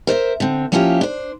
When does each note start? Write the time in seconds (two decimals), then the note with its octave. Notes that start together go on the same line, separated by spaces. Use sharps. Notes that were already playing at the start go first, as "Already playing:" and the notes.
0.07 A#4 C5 D5 E5
0.40 D3 C4
0.72 F3 A#3 C#4 E4 F4 G4
1.01 D4 C5